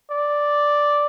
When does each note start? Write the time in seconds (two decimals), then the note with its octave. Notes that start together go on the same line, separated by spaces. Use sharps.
0.11 D5